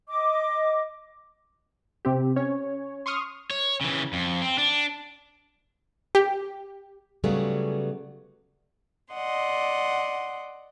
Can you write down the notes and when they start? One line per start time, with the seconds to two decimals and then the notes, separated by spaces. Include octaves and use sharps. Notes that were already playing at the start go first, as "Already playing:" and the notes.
0.08 D#5 D6
2.05 C3 C4 G4
2.36 C#4 C#5
3.06 C6 C#6 D#6 F6
3.51 C#5
3.81 C#3 E3
4.13 F2
4.42 C4
4.58 D4
6.15 G4
7.24 C#3 F#3 G3 A3 B3 G#4
9.13 D5 D#5 F#5 C6